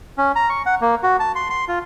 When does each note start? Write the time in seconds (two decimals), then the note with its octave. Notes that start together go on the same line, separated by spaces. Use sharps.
0.18 C#4
0.36 A#5
0.50 C#6
0.66 F#5
0.81 A#3
1.03 F#4
1.20 A5
1.35 C6
1.50 C6
1.68 F4